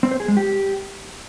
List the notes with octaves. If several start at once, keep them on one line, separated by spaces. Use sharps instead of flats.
C4
C5
G#4
G#3
G4